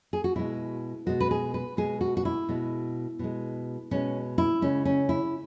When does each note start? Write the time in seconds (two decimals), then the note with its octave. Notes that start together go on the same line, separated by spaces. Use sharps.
0.13 G#4
0.24 F#4
0.36 B2 G#3 E4
1.07 B2 G#3 F#4
1.20 B4
1.31 G#4
1.54 B4
1.77 B2 G#3 G#4
2.01 F#4
2.17 F#4
2.25 E4
2.49 B2 G#3
3.19 B2 G#3
3.91 B2 G#3 C#4
4.38 E4
4.61 C#3 G#3 C#4
4.85 C#4
5.09 E4